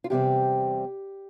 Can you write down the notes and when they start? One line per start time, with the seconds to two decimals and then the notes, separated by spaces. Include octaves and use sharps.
0.04 F4
0.10 E2 C3 G3 C4 G4